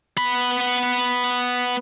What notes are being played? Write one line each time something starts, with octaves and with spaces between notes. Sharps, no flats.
B3 B5